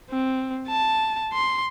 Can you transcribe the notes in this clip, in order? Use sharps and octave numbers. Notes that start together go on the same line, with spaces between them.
C4
A5
C6